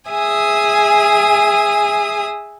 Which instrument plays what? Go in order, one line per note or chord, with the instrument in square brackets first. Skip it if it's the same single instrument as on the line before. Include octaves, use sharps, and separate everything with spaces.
[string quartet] G#4 E5 G#5 D#6